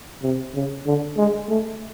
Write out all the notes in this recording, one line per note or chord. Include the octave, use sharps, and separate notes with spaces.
C3
C#3
D3
G#3
A3